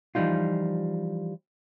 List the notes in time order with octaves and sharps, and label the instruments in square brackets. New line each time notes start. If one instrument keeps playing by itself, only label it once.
[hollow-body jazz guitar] E3 F3 G3 D#4 F4